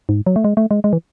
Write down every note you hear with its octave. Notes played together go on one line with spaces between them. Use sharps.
G#2
F#3
A3
G#3
A3
G#3
G#3
E3